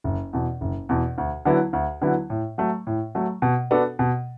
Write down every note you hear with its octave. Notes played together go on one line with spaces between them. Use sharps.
F#1
E2 B2
F#1
E2 B2
D2
D3 F#3 B3 E4
D2
D3 F#3 B3 E4
A2
F#3 A3
A2
F#3 A3
B2
B3 D4 F#4 A4
B2